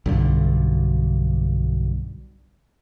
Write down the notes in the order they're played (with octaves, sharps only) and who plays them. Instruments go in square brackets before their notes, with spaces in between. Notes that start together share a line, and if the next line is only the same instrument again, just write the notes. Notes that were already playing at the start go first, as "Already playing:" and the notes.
[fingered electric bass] B1 G2 D3